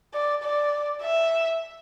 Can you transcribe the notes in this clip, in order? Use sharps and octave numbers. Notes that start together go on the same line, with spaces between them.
D5
D5
E5